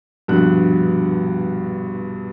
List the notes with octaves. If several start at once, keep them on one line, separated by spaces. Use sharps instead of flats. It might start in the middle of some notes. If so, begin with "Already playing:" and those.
A#1 G2 B2 F#6